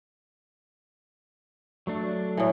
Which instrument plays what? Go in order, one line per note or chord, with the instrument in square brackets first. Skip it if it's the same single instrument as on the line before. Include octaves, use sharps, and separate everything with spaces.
[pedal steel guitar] F#3 A3 D4
[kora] A2 E3